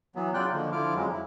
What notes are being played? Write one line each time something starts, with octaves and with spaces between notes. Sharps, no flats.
E3 F#3 B3
C#3 F#3 F4 D5 G5 F#6
D3 D#3 F3 A#3
D3 F3 E4 F4 D6 F6
F2 C#3 F#3 G#3
E4